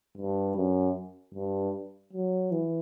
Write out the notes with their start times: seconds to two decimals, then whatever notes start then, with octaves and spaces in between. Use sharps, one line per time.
0.17 G2
0.56 F#2
1.34 G2
2.13 F#3
2.51 E3